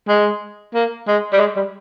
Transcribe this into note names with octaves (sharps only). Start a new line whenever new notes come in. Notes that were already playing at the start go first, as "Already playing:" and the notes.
G#3
A#3
G#3
G3
G#3
G3